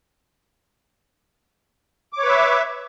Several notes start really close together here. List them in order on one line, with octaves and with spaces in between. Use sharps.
D6 C#5 B4 E5